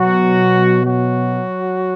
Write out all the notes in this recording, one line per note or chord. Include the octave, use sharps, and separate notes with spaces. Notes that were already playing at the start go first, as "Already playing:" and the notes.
Already playing: B2 F#3 F#4
F#3 F#4